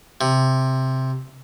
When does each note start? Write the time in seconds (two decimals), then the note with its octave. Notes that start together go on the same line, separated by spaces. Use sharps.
0.21 C3